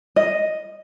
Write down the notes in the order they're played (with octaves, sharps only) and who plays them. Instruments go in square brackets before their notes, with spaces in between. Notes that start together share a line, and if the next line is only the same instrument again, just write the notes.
[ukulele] D#5